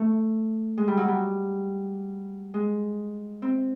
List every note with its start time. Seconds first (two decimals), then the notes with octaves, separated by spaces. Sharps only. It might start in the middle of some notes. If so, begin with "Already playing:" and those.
Already playing: A3
0.78 G#3
0.88 G3
0.97 F#3
1.08 G3
2.54 G#3
3.42 C4